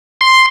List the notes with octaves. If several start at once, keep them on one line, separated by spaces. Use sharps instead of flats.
C6